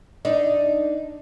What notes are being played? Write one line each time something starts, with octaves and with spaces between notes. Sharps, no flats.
D4 D#4